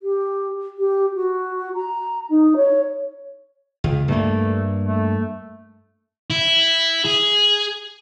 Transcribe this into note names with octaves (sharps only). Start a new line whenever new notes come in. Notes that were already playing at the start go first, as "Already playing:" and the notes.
G4
G4
F#4
A#5
D#4
C#5
C#2
G2 A3 A#3
A3
E4
G#4